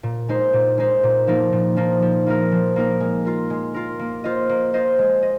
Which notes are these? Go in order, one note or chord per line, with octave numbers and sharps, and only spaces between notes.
A#2
G#3 D#4 C5
A#2
G#3 D#4 C5
A#2
F3 A#3 D#4
A#2
F3 A#3 D#4
F3
A#3 D#4 A#4
F3
A#3 D#4 A#4
G#3
F4 A#4
G#3
F4 A#4
A#3
F4 C5 D#5
A#3
F4 C5 D#5
G#3
D#5